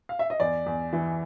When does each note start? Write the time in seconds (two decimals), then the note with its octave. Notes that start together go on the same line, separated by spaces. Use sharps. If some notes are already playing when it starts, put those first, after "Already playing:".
0.09 F5
0.19 E5
0.30 D#5
0.40 E2 D5
0.66 E2
0.93 E3